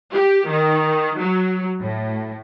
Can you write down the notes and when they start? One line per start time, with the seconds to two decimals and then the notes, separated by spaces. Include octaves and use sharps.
0.12 G4
0.48 D#3
1.19 F#3
1.81 A2